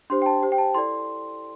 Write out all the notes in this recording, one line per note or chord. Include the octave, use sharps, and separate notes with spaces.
D4 G4 C5 C6
G5
A5
G4 C5
G5
A5
E4 A4 D5 C6